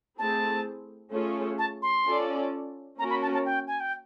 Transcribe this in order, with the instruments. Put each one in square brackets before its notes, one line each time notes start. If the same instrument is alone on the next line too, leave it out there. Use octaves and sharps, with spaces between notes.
[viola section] A3 C4 E4 G#4 [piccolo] A5
[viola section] A3 C#4 F4 G#4 C#5
[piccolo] A5
C6
[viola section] C#4 F4 A4 D5
[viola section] A#3 C#4 F#4 A#4 [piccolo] A#5
[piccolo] B5
A5
A5
G5
G#5
G5